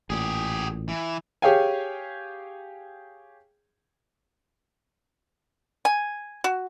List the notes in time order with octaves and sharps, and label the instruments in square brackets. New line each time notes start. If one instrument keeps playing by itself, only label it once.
[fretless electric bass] A1 A#2 [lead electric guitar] G4 G#4
[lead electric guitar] E3
[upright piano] G4 G#4 C#5 F5 G5 G#5
[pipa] G#5
F#4